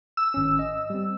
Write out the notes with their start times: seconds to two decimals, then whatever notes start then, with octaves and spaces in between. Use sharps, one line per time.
0.17 E6
0.34 G#1 C#4
0.59 D#5
0.90 G3 C4